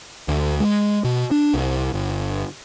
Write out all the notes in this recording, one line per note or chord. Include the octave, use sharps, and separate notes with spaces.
D2
G#3
B2
D4
C2
G1